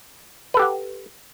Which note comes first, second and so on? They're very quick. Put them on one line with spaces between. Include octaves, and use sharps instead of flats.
B4 A4 G4 F#5